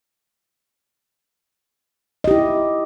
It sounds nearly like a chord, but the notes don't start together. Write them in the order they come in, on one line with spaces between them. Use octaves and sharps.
D#5 G4 E4